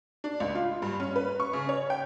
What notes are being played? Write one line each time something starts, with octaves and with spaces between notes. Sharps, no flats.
D4
C#2
F4
G2
C#4
B4
C#6
C#3
C#5
G5